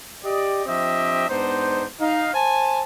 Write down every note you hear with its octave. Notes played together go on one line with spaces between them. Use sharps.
G4 D5 D#5
F3 C4 D4 G4 D#5 E5
G#2 B3 D4 D#4 C5
D#4 F5
C5 G#5 A5